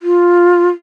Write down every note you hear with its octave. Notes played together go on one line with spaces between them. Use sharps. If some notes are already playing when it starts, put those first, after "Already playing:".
F4